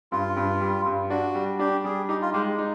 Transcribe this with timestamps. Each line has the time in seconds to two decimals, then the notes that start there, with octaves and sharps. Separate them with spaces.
0.12 G2 F4
0.36 G2
0.61 G3
0.86 G2
1.10 D4 F#4
1.35 G3
1.59 D4 G4
1.84 G3 G#4
2.09 D#4 G4
2.22 F4
2.33 G#3 G4
2.58 D#4